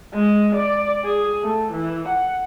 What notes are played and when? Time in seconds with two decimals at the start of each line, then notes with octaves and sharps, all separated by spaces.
0.14 G#3
0.55 D5
1.05 G#4
1.43 A3
1.72 E3
2.08 F#5